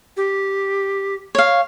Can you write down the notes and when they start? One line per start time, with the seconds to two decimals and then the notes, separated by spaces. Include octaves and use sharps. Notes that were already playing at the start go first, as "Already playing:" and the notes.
0.17 G4
1.35 C#5 F5